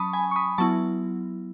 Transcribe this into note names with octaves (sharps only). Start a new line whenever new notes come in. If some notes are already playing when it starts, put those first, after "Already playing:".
Already playing: F#3 C#4 A5 B5 C#6 D#6
G#5 B5
C#6
B5 D#6
F#3 B3 E4 A5 C#6